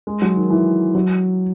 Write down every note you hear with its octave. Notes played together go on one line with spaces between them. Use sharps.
G#3
F#3
D#3
E3
F#3